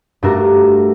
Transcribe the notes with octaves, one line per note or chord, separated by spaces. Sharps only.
G2 A3 D4 F#4 A#4 A#5